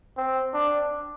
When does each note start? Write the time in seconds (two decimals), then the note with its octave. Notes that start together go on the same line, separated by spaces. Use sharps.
0.17 C4
0.54 D4